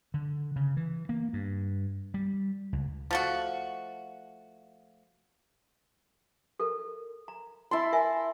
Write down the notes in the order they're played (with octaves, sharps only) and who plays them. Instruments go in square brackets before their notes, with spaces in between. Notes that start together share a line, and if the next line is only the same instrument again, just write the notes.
[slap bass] D3
C#3
E3
A#3
G2
G3
C#2
[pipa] F3 A3 F#4
[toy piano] A4 A#4
A#5
[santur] E4 A5 C6
[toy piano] A#4 E5 G#5